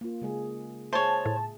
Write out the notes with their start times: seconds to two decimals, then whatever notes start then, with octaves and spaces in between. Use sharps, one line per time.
0.01 A#3 F4
0.22 C#3 G#3 G#4
0.93 G#4 C5 C#5 E5 A5
1.26 A2